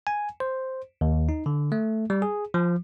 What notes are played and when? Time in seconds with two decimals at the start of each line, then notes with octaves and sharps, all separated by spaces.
0.07 G#5
0.40 C5
1.01 D#2
1.29 D#4
1.46 D3
1.72 A3
2.10 G3
2.22 G#4
2.54 F3